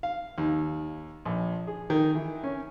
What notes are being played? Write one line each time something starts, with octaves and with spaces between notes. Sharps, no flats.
F5
D#2
A#1
G#4
D#3
E3
C#4